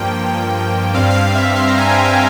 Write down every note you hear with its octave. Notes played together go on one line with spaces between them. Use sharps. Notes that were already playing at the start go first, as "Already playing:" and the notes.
Already playing: G2 F3 A#3 G5
G2 G3 C4 F5
F5
F5
E5
F5
C6
A#5
G#5
G5
F5